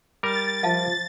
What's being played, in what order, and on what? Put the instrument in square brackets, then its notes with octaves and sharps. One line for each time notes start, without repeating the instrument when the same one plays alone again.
[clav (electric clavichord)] G3 A#4 [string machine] A6
[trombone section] F3 [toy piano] E5 F5 A5